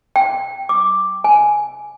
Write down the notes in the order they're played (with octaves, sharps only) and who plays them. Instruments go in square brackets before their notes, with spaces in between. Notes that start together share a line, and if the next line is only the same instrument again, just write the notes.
[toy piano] G5
D6
G#5